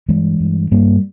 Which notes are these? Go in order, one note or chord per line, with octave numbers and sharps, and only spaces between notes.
G2 E3 G#3
G2
G2 G3 A#3